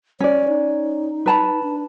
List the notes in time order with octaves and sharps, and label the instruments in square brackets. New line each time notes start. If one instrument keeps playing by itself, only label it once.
[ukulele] C#4 D5 [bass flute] C#5
[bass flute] D#4
[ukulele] B4 A5 B5
[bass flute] D4